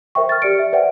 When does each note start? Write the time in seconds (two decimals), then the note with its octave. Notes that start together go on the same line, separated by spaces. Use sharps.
0.15 A#4 C5 E5 G5 C#6
0.29 F6 A6
0.42 G4 D5 C#7 D7
0.59 E5
0.73 B4 C5 D5 E5 F#5 G5